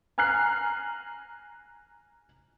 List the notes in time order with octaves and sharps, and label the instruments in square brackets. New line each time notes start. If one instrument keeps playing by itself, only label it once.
[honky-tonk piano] G#5 A#5 F6 F#6 C7